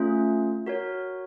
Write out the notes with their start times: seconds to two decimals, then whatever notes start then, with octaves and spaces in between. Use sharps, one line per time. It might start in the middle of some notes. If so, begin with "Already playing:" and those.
Already playing: A3 C#4 F4
0.66 F#4 A#4 C#5